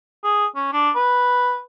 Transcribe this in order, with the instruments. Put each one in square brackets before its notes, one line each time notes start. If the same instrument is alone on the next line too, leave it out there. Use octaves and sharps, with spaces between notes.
[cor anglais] G#4
C#4
D4
B4